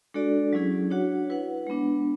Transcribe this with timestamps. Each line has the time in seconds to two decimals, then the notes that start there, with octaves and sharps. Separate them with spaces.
0.14 G#3 D4 F#4 A4 D5
0.53 F#3 C#4 E4 G#4
0.90 D4 F#4 C#5 F#5
1.30 E4 B4 F#5
1.67 G#3 B3 D4